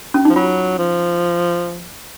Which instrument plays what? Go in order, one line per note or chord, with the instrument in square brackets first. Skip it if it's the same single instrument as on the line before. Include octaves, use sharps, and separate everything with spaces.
[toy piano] C#4
[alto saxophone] F3 [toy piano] D#4
[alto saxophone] F#3 [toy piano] F4
[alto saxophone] F3